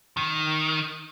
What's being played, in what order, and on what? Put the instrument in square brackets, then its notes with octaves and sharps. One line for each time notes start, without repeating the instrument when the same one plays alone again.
[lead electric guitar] D#3